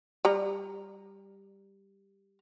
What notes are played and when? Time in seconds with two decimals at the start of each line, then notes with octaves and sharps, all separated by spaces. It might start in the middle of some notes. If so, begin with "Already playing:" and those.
0.25 G3 A#5